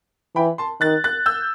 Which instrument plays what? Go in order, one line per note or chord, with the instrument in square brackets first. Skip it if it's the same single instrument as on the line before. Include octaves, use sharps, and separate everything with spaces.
[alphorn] E3 [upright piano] G5 B5
[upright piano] A5 C6
[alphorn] D#3 [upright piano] F#6 A6
[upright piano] F#6 A6
E6 G6